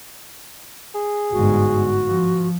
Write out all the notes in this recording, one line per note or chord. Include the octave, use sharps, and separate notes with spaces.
G#4
G1 G#2 F#4
F3